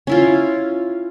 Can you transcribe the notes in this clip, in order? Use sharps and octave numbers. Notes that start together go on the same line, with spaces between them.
C#4 E4 F4